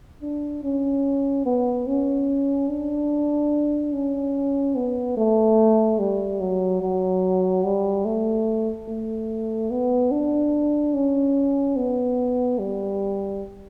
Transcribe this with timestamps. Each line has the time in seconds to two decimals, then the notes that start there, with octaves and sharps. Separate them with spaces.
0.22 D4
0.64 C#4
1.46 B3
1.87 C#4
2.69 D4
3.93 C#4
4.76 B3
5.17 A3
5.99 G3
6.41 F#3
6.81 F#3
7.64 G3
8.05 A3
8.88 A3
9.70 B3
10.11 D4
10.94 C#4
11.77 B3
12.59 G3